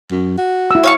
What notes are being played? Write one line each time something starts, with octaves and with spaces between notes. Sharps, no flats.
F#2
F#4
E4 E6
C#5 F5 C#6